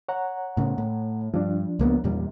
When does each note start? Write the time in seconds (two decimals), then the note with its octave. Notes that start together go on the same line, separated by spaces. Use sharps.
0.09 C#5 F#5 A#5
0.57 A2 C#3
0.78 A2
1.34 G2 F3 D4
1.79 C#2 A#3 B3
2.04 E2 A#2 G3